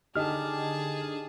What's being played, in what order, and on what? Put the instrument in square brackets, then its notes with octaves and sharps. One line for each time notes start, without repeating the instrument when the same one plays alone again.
[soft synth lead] D3 [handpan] D4 D#4 G4 [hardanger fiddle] G#4 A5 [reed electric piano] D#5 F6